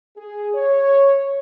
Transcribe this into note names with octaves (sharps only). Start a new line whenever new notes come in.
G#4
C#5